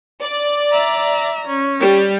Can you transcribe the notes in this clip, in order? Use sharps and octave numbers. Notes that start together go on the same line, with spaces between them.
D5
E5 A#5
C#4
G3